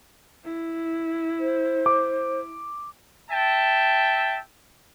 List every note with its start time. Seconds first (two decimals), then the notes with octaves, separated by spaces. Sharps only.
0.44 E4
1.40 C5
1.86 D6
3.30 E5 G5 A5